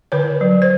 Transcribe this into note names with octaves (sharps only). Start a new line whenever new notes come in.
D3 B4 C#5
F#3
C5